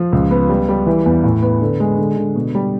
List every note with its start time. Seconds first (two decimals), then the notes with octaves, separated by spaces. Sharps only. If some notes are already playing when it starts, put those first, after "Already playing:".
Already playing: F3
0.13 C#2
0.31 B3
0.49 G3
0.69 G3
0.87 E3
1.06 E2
1.24 A2
1.42 B3
1.61 D3
1.80 G#3
1.98 D3
2.17 D3
2.36 B2
2.55 G3